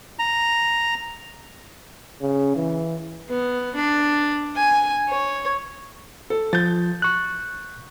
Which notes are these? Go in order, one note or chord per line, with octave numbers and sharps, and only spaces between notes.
A#5
C#3
E3
B3
D4
G#5
C#5
A4
F3 G6 A6
C#6 F#6